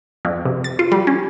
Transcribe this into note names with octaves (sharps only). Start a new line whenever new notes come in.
F2
C3
A6
F4
G3
C#4